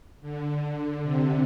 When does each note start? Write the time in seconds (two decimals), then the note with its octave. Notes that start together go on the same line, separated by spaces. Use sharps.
0.22 D3
1.03 C3